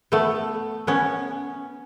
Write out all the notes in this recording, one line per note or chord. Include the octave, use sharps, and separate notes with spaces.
A3 B3
B3 C#4